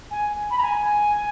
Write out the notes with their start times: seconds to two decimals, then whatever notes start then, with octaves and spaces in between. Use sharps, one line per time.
0.11 G#5
0.51 B5
0.58 A#5
0.63 G#5